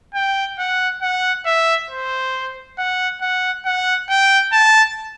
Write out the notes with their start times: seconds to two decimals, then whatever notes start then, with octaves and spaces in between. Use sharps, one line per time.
0.15 G5
0.59 F#5
1.02 F#5
1.46 E5
1.90 C5
2.78 F#5
3.21 F#5
3.65 F#5
4.10 G5
4.53 A5